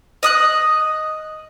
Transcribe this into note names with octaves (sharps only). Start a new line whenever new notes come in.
D#5 D#6 F#6